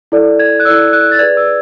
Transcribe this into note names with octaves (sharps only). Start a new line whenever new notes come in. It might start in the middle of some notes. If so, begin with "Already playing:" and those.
E4 A4 D5
G#6
F#6
E4 A4 D5 E6
F#6
A6
G#4 B4 D5 G#6
E6